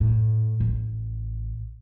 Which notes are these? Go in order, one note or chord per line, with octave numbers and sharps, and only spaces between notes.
A2
A1